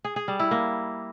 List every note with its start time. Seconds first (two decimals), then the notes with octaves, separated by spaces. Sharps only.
0.05 G#4
0.16 G#4
0.28 G3
0.40 E4
0.51 A#3